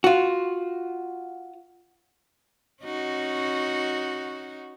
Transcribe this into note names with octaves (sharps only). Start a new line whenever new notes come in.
F4 F#4
C#4 D#4 F#4